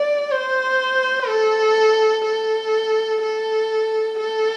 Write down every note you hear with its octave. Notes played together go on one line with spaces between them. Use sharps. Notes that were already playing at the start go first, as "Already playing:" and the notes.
Already playing: D5
C5
A4
A4
A4
A4